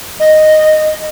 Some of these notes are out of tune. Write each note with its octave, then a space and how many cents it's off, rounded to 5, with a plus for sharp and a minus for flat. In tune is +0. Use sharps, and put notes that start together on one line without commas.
D#5 -5